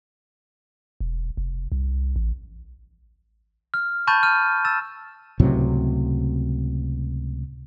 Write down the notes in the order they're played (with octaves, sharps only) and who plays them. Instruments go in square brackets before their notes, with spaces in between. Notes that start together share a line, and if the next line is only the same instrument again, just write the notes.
[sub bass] E1
F1
C2
A1
[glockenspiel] F6
A5 B5 C#6 G6 A6 D#7
F6 D#7
E6 A6 E7
[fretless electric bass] C#2 A2 C3 F#3